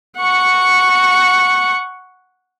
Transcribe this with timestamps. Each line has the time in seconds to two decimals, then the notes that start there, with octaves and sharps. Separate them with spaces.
0.18 F#5 C#6